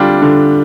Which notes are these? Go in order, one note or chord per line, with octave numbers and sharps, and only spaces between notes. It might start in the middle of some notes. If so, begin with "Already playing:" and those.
Already playing: D3 G3 D4 F4
D3